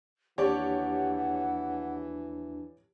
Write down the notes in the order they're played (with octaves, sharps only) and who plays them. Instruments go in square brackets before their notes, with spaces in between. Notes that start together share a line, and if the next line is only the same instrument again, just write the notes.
[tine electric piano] D#2 D4 [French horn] E3 [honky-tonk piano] G4 C#5 D5 [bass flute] F#5